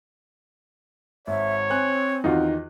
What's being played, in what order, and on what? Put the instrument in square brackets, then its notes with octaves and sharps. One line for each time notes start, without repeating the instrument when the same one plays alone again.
[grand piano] G#1 [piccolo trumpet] C#5 [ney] E5
[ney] C4 [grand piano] C5 G#5 F#6
[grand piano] E2 D#3 [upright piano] D#4 F4 F#4